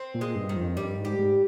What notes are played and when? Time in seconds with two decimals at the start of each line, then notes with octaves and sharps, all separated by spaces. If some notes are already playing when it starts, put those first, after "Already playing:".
Already playing: C4
0.14 A#2
0.21 G#3
0.35 G2
0.49 D#3
0.56 F2
0.77 G2 G3
0.98 G#2
1.05 G4
1.19 G#2